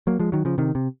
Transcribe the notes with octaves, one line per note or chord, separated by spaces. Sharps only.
F#3 A#3
F3 G#3
D#3 F#3
C#3 F3
C3 D#3
C3